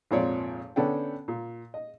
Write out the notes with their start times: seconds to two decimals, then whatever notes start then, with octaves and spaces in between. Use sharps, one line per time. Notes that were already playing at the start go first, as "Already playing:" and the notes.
0.11 G#1 F2 A#2 C4 C#5 D5
0.76 D3 B3 C#4 D4 A4 G5
1.28 A#2
1.74 D#5